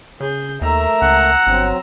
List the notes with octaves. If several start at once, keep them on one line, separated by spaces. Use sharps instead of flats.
C#3 G#4 G6
D#2 A3 A#4 E5 A#5 E6
C#2 F#5
G1 F#3 C4